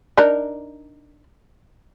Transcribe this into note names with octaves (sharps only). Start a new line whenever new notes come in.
D4 D#4 A#4